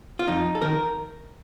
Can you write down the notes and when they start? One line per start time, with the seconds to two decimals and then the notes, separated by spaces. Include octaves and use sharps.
0.19 F4
0.27 F2 D#4
0.55 A4
0.62 D#3 A#4